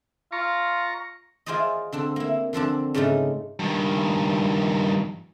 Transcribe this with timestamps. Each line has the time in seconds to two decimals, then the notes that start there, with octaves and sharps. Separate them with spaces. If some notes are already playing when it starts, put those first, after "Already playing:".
0.32 F4 A#5 C#6
1.46 E4 F4 G#4 C5 D5 D#5
1.92 D3 C4 D4
2.16 A#3 E4
2.53 D3 F3 C4 D4
2.94 G#2 C#3 A3 D4 D#4
3.60 G2 D#3